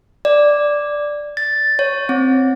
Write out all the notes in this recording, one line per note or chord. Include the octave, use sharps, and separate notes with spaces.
D5
A6
C#5
C4